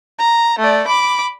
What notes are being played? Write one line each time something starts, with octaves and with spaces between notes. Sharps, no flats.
A#5
A3 D5
B5 D6